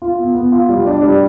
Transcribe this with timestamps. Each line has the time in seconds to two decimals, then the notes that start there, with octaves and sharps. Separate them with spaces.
0.02 F4
0.18 B3
0.35 B3
0.52 F4
0.69 G3
0.86 D4
1.03 G3